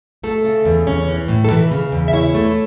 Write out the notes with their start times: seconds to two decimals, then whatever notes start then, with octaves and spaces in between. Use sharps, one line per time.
0.23 A3 A4
0.45 C#3
0.65 E2
0.87 C#4
1.08 E3
1.28 A2
1.45 A4
1.50 E3 B4
1.71 C#3
1.92 E2
2.08 E5
2.13 E4 C#5
2.35 A3